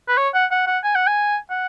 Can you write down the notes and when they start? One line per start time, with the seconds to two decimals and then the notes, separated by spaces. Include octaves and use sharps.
0.09 B4
0.18 C#5
0.34 F#5
0.51 F#5
0.67 F#5
0.84 G#5
0.95 F#5
1.07 G#5
1.50 F#5